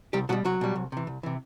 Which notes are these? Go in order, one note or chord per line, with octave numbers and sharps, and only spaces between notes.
C2 G3 G4
B2 F#3 G3 F#4
C2 F#3 F#4
B2 G3
C2
C3 E3
C2
C3 E3